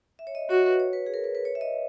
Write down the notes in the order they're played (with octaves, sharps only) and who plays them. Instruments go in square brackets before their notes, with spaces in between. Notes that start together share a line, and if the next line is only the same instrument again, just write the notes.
[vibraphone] E5
C#5
D#5
[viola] F#4 [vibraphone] C#5
[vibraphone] B4
C#5
B4
G#4
A#4
B4
B4
C#5
E5
D#5